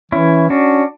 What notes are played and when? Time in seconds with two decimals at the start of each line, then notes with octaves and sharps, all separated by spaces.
0.12 E3 C#4 E4
0.50 C#4 D4 F#4